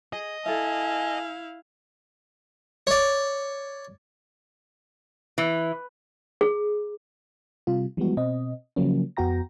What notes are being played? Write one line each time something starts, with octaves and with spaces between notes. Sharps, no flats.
G#4 D#5
E4 A4 E5 F5 G#5
C#5 D5
E3
G#4
C3 G3 F4
E3 F3 G3 G#3 B3 F#4
B2 C4 D#5
C#3 F3 F#3 A#3 C#4
F2 B3 F#4 G5 A#5 A#6